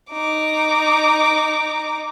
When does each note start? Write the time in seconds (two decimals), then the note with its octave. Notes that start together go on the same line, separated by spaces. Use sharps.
0.12 D#4 D6